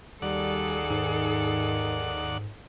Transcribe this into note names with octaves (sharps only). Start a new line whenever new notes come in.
D#2 G3 G#4 A4 D5 F#5
G#2 D#3